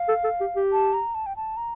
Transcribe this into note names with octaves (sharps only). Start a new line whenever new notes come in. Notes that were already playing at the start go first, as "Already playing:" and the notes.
Already playing: F5
A4
A4
G4
G4
A5
A#5
A5
G5
A5
A#5